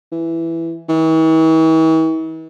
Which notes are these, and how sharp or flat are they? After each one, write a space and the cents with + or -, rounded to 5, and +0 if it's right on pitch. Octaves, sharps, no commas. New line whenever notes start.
E3 +5
E3 -45